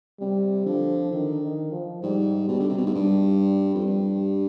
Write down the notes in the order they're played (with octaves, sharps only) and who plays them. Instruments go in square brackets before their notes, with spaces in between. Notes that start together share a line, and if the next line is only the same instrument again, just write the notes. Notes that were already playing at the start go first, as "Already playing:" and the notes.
[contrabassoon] C3 [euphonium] G3
[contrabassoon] D3 [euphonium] F3
[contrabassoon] D3 [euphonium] D#3
[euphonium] D#3
F3
[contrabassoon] G#2 [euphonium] G3
[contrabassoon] B2 [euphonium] G3
[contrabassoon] D3
C3
B2
G#2
[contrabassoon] G2 [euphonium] G3
[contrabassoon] F2
G2